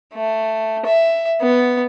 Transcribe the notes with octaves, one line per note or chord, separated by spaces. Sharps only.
A3
E5
B3